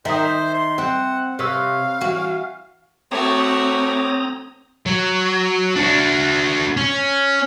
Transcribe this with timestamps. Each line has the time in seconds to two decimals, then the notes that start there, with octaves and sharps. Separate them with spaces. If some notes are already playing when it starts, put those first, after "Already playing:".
0.05 D#3 C5 E5 D#6
0.54 C6
0.78 C4 F#5
1.39 C3 B4 C#5 F5 E6
2.01 E3 F#4
3.12 A3 C4 F#4 C#5 A#5 D6 D#6
4.86 F#3
5.76 D4 F#4
6.77 C#4